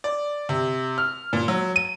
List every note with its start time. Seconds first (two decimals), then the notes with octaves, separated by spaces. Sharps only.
0.04 D5
0.49 C3
0.98 F6
1.33 A#2
1.48 F#3
1.76 D#7